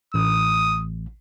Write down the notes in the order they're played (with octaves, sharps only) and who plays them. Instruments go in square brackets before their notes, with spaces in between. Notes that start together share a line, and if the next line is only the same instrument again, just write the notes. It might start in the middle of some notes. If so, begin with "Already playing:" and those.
[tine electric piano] A1 [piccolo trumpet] D#6